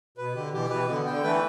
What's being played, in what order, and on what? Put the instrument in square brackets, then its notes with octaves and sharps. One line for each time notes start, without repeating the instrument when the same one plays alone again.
[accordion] B2 [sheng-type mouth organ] B4
[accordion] D3 [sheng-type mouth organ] G4
[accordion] B2 E3 [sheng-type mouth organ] G4
[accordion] B2 E3 [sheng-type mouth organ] B4
[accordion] D3 [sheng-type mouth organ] B3
[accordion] D3 [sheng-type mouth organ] G5
[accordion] E3 A3 [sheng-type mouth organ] B4